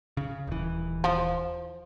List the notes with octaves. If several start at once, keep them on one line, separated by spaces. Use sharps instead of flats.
C#3
D#1 E3
F3